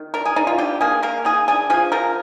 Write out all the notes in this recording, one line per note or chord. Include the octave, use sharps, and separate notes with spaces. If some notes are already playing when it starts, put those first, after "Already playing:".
Already playing: D#3
D4 A#4
G#4
D4 D#4
F4
D4 G4
A#3 G#4
A#3 A#4
D#3 G#4
D4 G#4
F3 G#4
F3 A#4